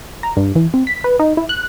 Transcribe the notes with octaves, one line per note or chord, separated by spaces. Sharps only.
A#5
G2
E3
C4
B6
B4
D#4
E4
F#6